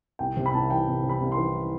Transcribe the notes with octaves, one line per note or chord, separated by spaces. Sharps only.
C2 G5
C3
B5
C2 A5
E3 G5
C2
C3
B5
C2
C6
E3